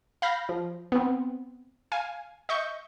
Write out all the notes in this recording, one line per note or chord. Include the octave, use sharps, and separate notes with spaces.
F5 B5 G6 A#6
F3
B3 C4
F5 G#5
D#5 E5 C#6 G6